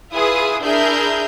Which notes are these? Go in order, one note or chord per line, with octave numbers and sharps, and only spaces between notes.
E4 F4 G#4 B4 D#6
D4 E4 G#4 A#4 E5 G6